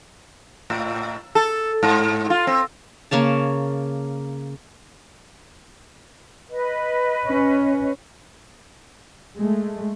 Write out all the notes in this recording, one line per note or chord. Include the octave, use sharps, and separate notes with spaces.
A2
A4
G#2
F4
C4
C#3 A#3 C#5 A5
B4 D#5
C#4
G#3 A3